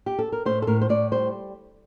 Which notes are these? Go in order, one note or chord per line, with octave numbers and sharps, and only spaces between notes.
G4
A4
A#4
A2 C5
A4
A2 A#4
C5
A2 D5
G3 C5